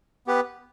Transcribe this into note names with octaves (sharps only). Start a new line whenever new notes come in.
B3 G4 B4